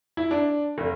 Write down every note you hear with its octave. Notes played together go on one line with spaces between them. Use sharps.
E4
D4
F1